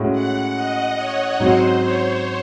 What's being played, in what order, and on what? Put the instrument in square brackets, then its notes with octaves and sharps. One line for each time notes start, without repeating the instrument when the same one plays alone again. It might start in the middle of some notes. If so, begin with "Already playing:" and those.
Already playing: [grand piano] A2 G#3 C#4 F#4
[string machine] F#5
D#5
C#5
[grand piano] G#2 F#3 C4 F#4 [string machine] C5
[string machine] C#5